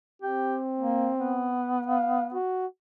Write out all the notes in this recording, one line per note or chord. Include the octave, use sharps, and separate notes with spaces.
C4 G4
A#3
B3
F5
F#4